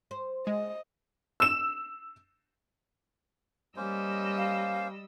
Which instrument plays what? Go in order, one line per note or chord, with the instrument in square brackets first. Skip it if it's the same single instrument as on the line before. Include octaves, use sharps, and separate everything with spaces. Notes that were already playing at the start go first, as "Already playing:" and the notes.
[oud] C5
[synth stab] G#3 [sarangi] D#5
[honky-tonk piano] E6 E7
[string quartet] G3 D#5 E6 [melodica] A#3 C#4 C5
[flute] F5